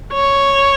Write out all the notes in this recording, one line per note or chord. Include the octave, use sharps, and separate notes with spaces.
C#5